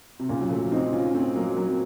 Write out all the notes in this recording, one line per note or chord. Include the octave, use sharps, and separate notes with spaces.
C3
A#2 C#3
F#3
F3 A3
C4 D#4
C#4 F4
A3 C4
F#3 A#3
F#3 A#3
C4